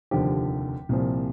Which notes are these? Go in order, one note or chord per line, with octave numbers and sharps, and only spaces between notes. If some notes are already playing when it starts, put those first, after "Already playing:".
F1 D#2 D3 F3 G4
C2 A#2 F3